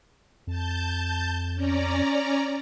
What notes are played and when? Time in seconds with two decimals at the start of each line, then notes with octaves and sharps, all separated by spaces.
0.47 F2 A5 G6
1.55 C#4 D5 A#5